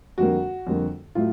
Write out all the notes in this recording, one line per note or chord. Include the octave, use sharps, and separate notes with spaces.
F2 D3 G3 A#3 F#4
F2 D3 G3 A#3
A2 F#3 A3 F4